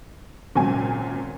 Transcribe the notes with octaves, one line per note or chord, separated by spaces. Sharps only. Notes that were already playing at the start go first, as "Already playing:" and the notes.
G#1 A#2 C#3 F#3 C4 G#5